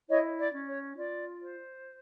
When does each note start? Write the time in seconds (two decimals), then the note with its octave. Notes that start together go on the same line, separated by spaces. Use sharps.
0.09 E4 C#5 D#5
0.39 D5
0.53 C#4
0.68 C#5
0.97 F4 D5
1.41 C5